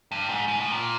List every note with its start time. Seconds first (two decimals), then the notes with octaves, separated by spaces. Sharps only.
0.12 G2
0.29 G#2
0.48 G#2
0.60 A2
0.72 A#2